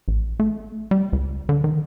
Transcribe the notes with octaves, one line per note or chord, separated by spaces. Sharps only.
A1
A3
G3
C#2
D3
D#3